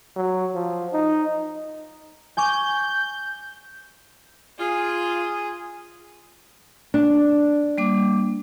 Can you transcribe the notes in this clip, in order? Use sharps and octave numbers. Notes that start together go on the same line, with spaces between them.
F#3
F3
D#4
G#5 C#6 D6 G6
F4 G#4
D4
G3 A#3 D6